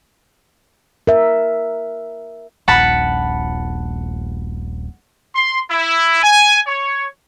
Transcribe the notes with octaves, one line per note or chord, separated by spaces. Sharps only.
A#4 E5
D#1 A#1 F#5 A5 B5
C6
E4
G#5
C#5